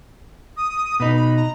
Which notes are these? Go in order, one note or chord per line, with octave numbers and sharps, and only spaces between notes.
D#6
B2 D#4 B4
B5
A#5